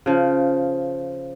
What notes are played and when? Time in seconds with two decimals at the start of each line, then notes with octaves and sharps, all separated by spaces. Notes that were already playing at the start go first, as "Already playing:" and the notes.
0.06 C#3 F3